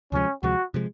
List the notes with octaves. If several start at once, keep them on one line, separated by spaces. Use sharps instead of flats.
D2 C3 F3 G#3 C#4
D2 C3 F3 G#3 F#4
C3 F3 G#3